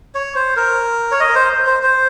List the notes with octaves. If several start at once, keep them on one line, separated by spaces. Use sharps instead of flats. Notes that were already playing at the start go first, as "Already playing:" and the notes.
C#5
C5
A#4
C#5
D#5
A#4
C5
C5
C5